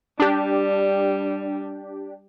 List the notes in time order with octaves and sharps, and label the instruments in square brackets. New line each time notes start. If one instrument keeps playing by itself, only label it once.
[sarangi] G3 [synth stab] D4 G4